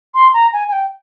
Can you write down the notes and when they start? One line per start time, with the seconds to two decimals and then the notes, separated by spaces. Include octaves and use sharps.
0.14 C6
0.34 A#5
0.53 G#5
0.68 G#5
0.73 G5